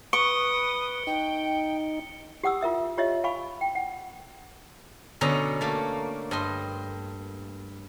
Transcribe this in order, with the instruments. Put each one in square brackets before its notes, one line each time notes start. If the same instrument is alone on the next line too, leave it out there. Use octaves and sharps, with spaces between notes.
[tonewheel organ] B4 [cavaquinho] C#6 [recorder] D#6 [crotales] C#7 D7 G7
[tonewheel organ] D#4 [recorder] G5
[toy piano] G4 F#5 D#6 E6
F4 A#4 E5 D#6
F4 G4 C#5 D#5 E5
F5 G#5 B5 C#6
G5
F#5
[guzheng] B2 D3 C#4 D#5 A#5
A3 A#3
G2 D#5 C6